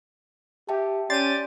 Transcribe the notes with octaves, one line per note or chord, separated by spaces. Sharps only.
G4 E5 G5 A5
C#4 G4 D5 C6 A6 C7 D#7